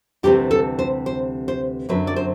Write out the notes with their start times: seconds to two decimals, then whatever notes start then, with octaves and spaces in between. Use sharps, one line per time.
0.23 D2 C3 E3 G3 C4 G4
0.51 A4
0.79 C5
1.06 C5
1.48 C5
1.89 F#2 D3 F#3 C4 B4
2.07 D5
2.16 C5